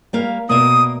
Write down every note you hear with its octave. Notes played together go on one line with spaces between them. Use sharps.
G3 A#3 F5
B2 A#3 D5 E5 D#6